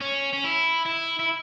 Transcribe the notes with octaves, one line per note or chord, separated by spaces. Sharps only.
C#4
C#4
E4
E4
E4